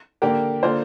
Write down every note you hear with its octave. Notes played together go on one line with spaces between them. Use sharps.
D3 A#3 G4 A#4
D3 A#3 F4 C5